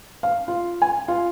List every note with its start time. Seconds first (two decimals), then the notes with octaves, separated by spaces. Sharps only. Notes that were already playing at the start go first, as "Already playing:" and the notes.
0.23 F5
0.48 F4
0.82 G#5
1.08 F4